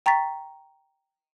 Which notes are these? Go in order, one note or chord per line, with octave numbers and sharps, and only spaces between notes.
G5 A#5 C#6 A6 B6